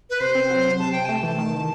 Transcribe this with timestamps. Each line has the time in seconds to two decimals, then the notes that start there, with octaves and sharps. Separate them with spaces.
0.10 B4
0.20 C3 C5
0.35 C4
0.50 F#3
0.65 C3
0.79 C3 A5
0.92 C3 G5
1.06 A3 A5
1.23 E3
1.38 D#3
1.53 D#3